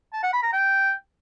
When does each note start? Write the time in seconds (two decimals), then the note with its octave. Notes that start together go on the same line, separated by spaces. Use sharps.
0.13 A5
0.23 F#5
0.33 B5
0.43 A#5
0.53 G5